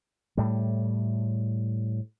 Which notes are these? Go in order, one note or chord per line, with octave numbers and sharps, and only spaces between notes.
A2 G3